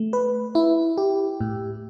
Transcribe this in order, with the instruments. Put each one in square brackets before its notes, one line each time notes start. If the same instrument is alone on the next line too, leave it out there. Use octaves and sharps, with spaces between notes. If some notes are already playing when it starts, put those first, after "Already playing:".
Already playing: [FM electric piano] A3
B4
E4
G4
A2